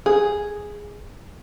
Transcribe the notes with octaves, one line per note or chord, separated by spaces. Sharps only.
G#4